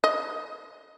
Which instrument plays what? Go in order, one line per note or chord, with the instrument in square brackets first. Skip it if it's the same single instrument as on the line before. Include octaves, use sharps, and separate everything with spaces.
[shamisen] D#5